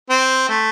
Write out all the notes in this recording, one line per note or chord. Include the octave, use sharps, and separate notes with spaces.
C4
A3